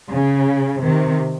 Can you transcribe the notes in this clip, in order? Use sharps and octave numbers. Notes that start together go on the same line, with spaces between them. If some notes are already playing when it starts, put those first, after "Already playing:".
C#3
C3 D#3